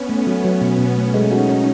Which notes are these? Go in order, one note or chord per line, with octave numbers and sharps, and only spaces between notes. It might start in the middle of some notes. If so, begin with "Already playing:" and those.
Already playing: B3 C#4
A3
F#3
F#3
B2
B2
A3
G#3 C#4 D#4
F#4
C#4